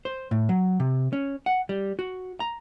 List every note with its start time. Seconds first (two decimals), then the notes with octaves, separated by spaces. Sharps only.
0.05 C5
0.31 A2
0.49 F#3
0.80 C3
1.13 C#4
1.46 F#5
1.69 G3
1.99 F#4
2.40 A#5